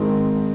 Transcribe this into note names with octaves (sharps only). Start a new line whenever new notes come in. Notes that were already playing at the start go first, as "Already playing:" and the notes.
Already playing: G#2 D#3 G#3 C4